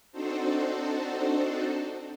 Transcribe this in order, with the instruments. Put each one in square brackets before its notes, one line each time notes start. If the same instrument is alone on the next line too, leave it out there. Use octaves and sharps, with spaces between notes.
[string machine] C4 D4 D#4 F#4 A4 C5